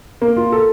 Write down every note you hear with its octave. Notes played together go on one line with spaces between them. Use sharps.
A#3
F4
A4